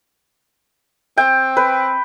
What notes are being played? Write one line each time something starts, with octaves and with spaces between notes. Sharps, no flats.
C4 G5
B4